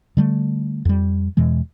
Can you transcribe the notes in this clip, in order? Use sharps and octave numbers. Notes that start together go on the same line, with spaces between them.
D3 G3 A3
F2 G3
E2 B2 E3 G#3